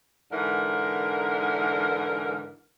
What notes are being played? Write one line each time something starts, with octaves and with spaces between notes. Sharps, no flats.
G#2 D3 E3 A#4